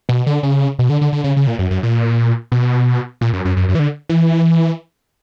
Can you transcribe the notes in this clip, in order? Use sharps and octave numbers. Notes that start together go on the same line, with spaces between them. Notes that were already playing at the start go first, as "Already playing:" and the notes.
B2
D3
C#3
B2
D3
D3
D3
C#3
C#3
A#2
F#2
F#2
A#2
B2
A#2
F#2
F#2
F#2
F#2
E3
D3
E3